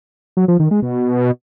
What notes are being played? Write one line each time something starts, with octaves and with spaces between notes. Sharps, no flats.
F#3
F3
D#3
G#3
B2